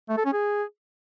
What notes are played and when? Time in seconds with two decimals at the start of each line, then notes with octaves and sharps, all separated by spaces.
0.09 A3
0.17 A4
0.25 C#4
0.33 G#4